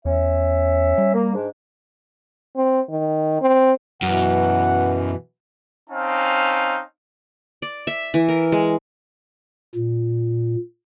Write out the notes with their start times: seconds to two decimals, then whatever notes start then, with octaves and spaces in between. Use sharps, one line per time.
0.05 E2 C#4 E5
0.98 G3
1.13 A#3
1.34 G#2 D4
2.56 C4
2.90 D#3
3.41 C4
4.02 F#2 B2 E3 F#5
5.90 C4 C#4 D#4 F5 A5
7.62 D5
7.87 E5
8.14 E3
8.28 A#4
8.52 G#3
9.75 A#2